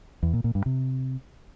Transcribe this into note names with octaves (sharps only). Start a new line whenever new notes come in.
E2
A#2
A#2
G2
C3